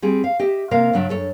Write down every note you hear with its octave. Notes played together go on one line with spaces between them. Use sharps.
G3 C4 G#4
F5
G4 D#5 E5
C3 A#3 A#4 F5
G2 C#3 F#3 D4 E5
F#2 A4 C#5